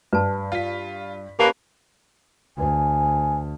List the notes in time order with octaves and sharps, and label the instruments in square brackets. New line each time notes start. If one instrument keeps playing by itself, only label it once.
[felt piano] G2 [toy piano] B4 A5
[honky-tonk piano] F4 B6
[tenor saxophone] A#3 [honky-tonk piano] C#4 A#4 B4 [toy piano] G4 [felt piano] A5 B5 F#6
[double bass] D2 [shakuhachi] G#5